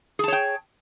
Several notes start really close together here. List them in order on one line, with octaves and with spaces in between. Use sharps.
G#4 A5 C#5 G5